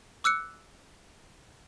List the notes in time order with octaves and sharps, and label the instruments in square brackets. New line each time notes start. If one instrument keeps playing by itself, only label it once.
[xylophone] D6 E6 F#6 C#7